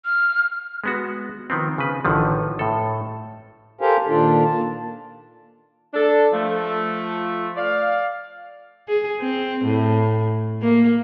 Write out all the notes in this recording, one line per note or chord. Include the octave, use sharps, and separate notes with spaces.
F6
G#3 B3 F#4
D#3 F3 B3 C4
C#3 B4
A1 D3 D#3 F3
A2 A4
G4 A4 A#4 C5 F5 G#5
A#2 D#3 D4 F4 A4
A#3 A5
D4 A4
F3 A3
D5 F5
G#4
C4
A2
A#3